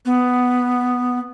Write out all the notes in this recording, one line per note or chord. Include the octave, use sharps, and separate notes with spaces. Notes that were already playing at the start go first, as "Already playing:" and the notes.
B3